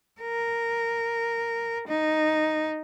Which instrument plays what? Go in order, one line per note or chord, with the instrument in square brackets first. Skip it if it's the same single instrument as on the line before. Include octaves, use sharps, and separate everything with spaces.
[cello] A#4
D#4